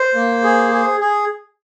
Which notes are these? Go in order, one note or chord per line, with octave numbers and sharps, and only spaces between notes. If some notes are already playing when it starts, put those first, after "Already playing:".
Already playing: C5
A#3
G#4
G#4
G#4